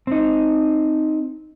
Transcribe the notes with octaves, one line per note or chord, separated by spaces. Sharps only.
C4 D#4